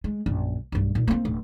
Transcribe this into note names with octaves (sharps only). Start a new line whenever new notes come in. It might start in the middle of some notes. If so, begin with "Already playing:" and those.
G#3
A#1 F#2
B1 G2
A#2 D#4
A#3 C4
D1